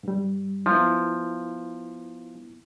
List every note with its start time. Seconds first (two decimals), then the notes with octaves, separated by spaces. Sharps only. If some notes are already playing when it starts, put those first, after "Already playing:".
0.03 G2 G3
0.66 F3 B3 E4